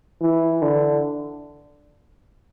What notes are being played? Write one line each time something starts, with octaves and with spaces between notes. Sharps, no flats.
E3
D3